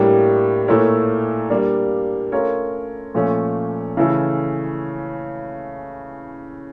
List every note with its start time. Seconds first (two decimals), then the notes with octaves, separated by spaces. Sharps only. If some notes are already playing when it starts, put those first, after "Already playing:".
Already playing: A2 G3 A#3 D4 G4
0.68 A#2 A3 E4 A#4 C#5
1.50 G3 A#3 D4
2.32 A3 C#4 F4 A#4 C#5
3.15 A#2 F3 A3 C#4
3.97 C#3 E3 A3 E4 A4